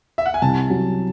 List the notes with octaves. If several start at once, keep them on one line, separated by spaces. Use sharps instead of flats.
E5
F#5
G#5
C2 A5
F#3